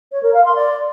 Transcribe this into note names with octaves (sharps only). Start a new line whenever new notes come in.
C#5
A#4
F5
C6
D5